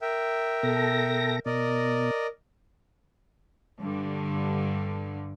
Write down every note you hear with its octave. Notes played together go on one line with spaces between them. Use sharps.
A#4 E5 G5
B2 A4 A#6
B2 A#4 D5 D#5
G2 D3